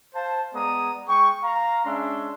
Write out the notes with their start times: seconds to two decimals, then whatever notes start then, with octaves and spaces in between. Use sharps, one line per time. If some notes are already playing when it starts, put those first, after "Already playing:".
0.14 C5 F5 A5
0.54 G#3 B3 D5 A#5 D#6
1.08 G#3 G5 C#6
1.44 F5 A#5
1.85 G#3 C#4 D4 E5 C6